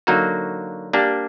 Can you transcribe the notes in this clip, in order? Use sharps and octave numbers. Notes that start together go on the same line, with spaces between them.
D3 F#3 A#3 D#4 F#4
G3 A#3 D4 G4